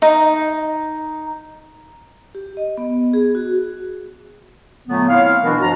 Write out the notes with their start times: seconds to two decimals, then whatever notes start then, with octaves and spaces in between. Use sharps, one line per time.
0.02 D#4
2.35 G4
2.57 D#5
2.77 B3
3.13 G#4
3.35 F#4
4.88 A#2 D3 F#3 A3 B3
5.08 C4 E4 C#5 F5
5.44 B2 E3 B3 D4 F#4 A#4
5.62 G2 B2 F3 B3 F#4 A#5